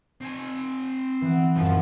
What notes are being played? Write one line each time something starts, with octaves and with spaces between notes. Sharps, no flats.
C4 G#5
E3 B3
D#1 F#2 F3